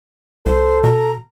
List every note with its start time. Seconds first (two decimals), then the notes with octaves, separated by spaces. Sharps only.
0.46 C2 A4 C5
0.84 B2 A#5